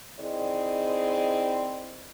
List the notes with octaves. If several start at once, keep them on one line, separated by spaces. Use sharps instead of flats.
D#3 C4 E4 G#4 D5 D#5